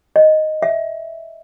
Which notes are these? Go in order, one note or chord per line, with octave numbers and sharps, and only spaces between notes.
D#5
E5